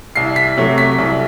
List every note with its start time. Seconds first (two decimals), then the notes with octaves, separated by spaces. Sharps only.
0.15 C2 C7
0.36 B6
0.57 C3 F#3 A3
0.78 B6
0.98 C2